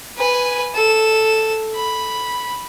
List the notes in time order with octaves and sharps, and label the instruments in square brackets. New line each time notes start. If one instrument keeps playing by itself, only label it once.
[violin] B4 G#5
A4 E7
B5